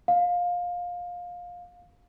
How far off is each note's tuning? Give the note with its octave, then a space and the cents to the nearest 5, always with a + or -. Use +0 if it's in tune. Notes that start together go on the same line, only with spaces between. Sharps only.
F5 +20